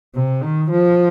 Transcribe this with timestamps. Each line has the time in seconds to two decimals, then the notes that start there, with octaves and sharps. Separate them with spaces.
0.15 C3
0.42 D#3
0.71 F3